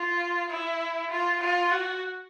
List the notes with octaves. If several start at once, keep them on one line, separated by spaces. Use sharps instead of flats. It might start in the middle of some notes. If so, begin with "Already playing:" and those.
Already playing: F4
E4
F4
F4
F#4